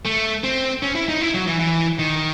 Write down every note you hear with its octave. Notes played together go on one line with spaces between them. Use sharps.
A3
C4
C#4
E4
D#4
E4
F#3
E3
E3
D#3